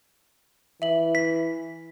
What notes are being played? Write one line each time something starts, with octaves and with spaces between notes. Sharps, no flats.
E3 E5 F#7
B6